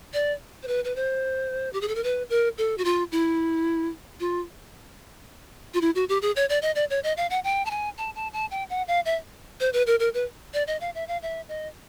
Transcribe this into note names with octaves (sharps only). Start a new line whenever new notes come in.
D5
C5
B4
B4
C5
G4
G#4
A4
A#4
B4
A#4
A4
F#4
F4
E4
F4
F4
E4
F#4
G4
G#4
C#5
D5
D#5
D5
C#5
D#5
F5
F#5
G5
A5
G#5
A5
A5
A5
G5
F#5
F5
E5
C5
B4
A#4
A#4
B4
D5
D#5
F5
E5
F5
E5
D#5